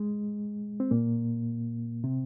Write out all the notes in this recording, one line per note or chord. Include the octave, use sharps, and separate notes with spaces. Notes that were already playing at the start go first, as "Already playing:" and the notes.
Already playing: G#3
C4
A#2 A#3
C3 C4